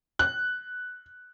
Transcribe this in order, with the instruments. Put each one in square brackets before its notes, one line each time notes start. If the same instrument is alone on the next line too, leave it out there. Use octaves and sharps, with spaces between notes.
[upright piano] F#6